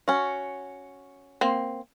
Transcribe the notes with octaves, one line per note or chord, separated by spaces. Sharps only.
C#4 F#4
A#3 C4